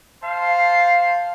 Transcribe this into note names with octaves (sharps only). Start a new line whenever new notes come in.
C5 F5 A5